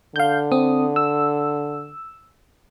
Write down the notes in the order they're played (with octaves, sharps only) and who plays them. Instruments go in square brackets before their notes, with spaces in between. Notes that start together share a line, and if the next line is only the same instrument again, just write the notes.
[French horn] D3 [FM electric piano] F5 G6
[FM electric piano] C4 D#6
E6